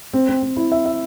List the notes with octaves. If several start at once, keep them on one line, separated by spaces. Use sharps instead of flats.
C4
C4
C4
E4
E5
E5